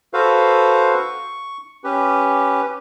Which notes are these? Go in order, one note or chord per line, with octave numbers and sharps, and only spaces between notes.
F#4 A4 B4 C5 F5
C#6
C#4 G4 B4